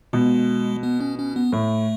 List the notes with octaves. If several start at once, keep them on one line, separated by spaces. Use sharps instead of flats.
B2 G#3
B3
C#4
C#4
B3
A2 A3